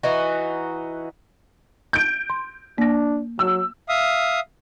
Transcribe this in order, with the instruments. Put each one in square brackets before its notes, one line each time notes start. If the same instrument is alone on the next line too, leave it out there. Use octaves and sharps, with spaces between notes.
[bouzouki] E3 D#4 F#4
[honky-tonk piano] G6 D7
[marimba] C6
[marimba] A#3 A#6 [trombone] D4
[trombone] F#3 [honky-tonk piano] E6
[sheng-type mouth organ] E5 F5 D#6